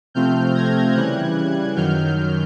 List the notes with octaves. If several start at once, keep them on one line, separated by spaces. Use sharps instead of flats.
C3 F3 A3 C4 F6 G6
G#6 A#6
C#3 E3 G3 F#6 G#6
F#2 D#3 F#3 F6 G6